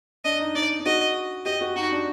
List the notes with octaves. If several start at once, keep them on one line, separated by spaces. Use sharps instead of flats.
D4 D#5
D#4
D#4 D5
D#4
F#4 D#5
G4 D#5
F#4
D#4 F#4
D4